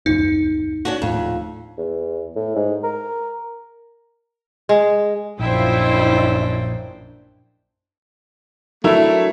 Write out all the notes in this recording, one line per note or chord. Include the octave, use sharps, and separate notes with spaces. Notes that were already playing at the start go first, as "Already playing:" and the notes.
D#1 C#2 F#2 D#4
C#4 D4 F#4
D#1 F2 A2
E2
A2
G#2
A#4
G#3
A#1 F#2 D4 E4 F4 C5 D#5 G5
F#3 A3 D4 E4 A#4